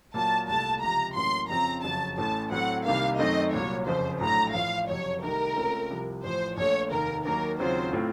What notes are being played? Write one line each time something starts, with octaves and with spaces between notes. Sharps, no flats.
A#2 F#3 A#3 A5
C2 A#2 A3 A5
C#2 C3 F3 A#5
A1 A2 F#3 A#3 C#4 C6
F2 C#3 F3 C4 A#5
F#1 F2 C#3 F#3 A5
A1 A2 A3 C#4 A5
A2 F#3 A3 C4 F#5
C2 C3 D#3 A#3 F5
F#2 D#3 A3 C4 D#4 D#5
C2 A#2 F#3 C#5
F#1 F2 C#3 C5
A#1 A2 F#3 A3 A#5
A1 A2 F3 F5
F#1 F2 C3 F#3 C#5
C2 C3 D#3 A3 A#4
C#2 C#3 A3 C4 F4
C2 C3 F3
A1 A2 F3 C5
A#1 A#2 A3 C#5
F1 D#2 D#3 A#4
D#2 D#3 F#3 A#3 A#4
D#2 C#3 F#3 C4 F4 C5
A2 A3 C4 F4